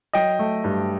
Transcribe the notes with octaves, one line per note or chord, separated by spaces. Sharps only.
F#3 D#5 G5
A3
G2